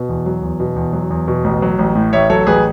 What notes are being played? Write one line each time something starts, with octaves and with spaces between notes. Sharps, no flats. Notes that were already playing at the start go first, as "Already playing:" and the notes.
Already playing: B2
E2
F#3
E2
B2
E2
F#3
E2
B2
A1
F#3
A1
A2
A1 C#5 E5
F#3 A4 C#5
A1 G#4 B4